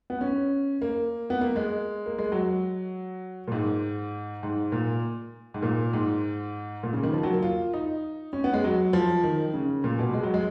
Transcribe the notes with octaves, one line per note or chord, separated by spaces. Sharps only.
B3
C#4
A#3
B3
A#3
G#3
A#3
G#3
F#3
A#2
G#2
G#2
A#2
G#2
A#2
G#2
A#2
C#3
D#3
F3
F#3
A#3
F4
D#4
C#4
B3
G#3
F#3
F3
D#3
C#3
A#2
B2
G#3
F#3
G#3